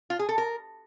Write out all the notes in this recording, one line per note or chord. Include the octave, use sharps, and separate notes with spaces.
F4
G#4
A4
A#4